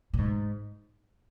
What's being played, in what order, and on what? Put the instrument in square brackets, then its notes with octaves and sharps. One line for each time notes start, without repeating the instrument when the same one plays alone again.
[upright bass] A#2
G#2